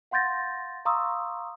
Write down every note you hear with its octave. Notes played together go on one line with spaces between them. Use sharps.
F5 F#5 C6 G6 A6 A#6
F5 A#5 C6 C#6 D#6 E6